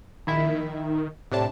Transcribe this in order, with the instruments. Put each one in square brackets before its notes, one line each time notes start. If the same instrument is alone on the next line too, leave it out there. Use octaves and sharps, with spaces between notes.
[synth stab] A#1 E4 E5 [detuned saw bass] D#3
[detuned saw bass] A2 [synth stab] C3 D4 A5